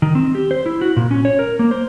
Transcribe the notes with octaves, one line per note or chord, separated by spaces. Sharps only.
D#3
C4
G4
C5
E4
F#4
A#2
C#4
C#5
A#4
A#3
C5